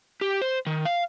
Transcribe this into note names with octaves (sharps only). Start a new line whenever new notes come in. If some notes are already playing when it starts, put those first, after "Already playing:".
G4
C5
D#3
F5